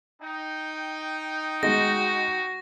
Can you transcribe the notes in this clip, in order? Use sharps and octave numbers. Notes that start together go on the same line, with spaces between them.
D#4 G5
G#3 F#4 A#6